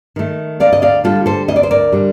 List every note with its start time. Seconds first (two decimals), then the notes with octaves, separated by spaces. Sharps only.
0.16 D#3 A3
0.60 D2 D5 F5
0.73 D#5
0.82 D5 F5
1.04 D3 G3 F4 A4
1.26 A4 C5
1.48 D2 D#5
1.56 D5
1.63 C5
1.71 A#4 D5
1.92 D3 G3